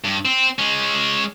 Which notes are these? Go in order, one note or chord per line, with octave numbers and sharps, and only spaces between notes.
G2
C4
G#3 C#4